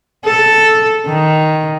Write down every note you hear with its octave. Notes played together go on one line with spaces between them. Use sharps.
A4
D#3